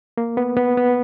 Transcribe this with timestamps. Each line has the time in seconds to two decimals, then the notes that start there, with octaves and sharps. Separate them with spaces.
0.17 A#3
0.37 B3
0.57 B3
0.77 B3